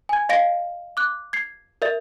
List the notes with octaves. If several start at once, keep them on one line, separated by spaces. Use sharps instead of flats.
G#5 G#6
D#5 F5 A#6 D7
D6 F#6
G#6 C7
A#4 D5 E5